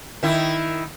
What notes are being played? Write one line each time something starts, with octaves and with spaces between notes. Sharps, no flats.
D#3 E4